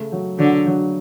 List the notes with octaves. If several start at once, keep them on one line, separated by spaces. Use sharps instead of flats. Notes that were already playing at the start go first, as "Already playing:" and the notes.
Already playing: C#3 A3
F#3
D3 F#3
F#3